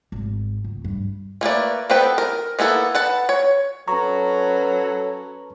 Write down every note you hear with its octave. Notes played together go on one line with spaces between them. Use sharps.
G#1
C#2
G2
A3 A#3 B4 D5
B3 C4 A4 B4 G5
A#4
A#3 B3 E4 A4
B4 F#5 A5
C#5
F#3 C#4 A4 B4 A#5 C#6